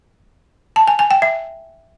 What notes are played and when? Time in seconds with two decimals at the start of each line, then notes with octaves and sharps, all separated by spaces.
0.76 A5
0.88 G#5
0.99 G#5
1.11 G5
1.22 E5